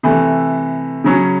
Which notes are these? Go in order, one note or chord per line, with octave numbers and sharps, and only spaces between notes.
C3 E3 A3
C#3 F#3 C#4